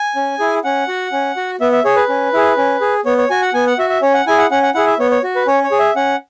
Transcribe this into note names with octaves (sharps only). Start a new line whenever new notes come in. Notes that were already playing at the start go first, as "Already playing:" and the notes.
Already playing: G#5
C#4
E4 G#4
C#4 F#5
F#4
C#4
F#4
B3 E5
E5
G#4 C#5
B4
C#4
E4 G#4
C#4
G#4
B3 C#5
C#5
F#4 G#5
F#5
B3 G#5
F#5
F#4 E5
E5
C#4 C#5
F#5
E4 G#4 G#5
F#5
C#4 F#5
F#5
E4 G#4 F#5
E5
B3 C#5
C#5
F#4
B4
C#4 C#5
C#5
G#4
E5
C#4 F#5